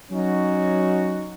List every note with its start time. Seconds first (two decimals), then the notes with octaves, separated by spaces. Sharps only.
0.12 F#3 C#4 D#4 F#4